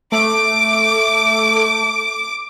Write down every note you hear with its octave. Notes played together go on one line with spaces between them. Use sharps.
A3 D6